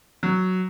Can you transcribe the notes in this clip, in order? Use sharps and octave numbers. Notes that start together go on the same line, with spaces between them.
F#3